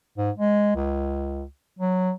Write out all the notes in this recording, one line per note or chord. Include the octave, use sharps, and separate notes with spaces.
G#2
G#3
C#2
F#3